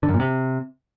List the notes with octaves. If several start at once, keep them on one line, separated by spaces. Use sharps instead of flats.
D3
F#2
A#2
C3